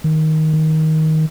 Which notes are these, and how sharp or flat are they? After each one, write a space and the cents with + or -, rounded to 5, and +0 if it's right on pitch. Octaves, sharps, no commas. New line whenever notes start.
D#3 +10
D#3 +15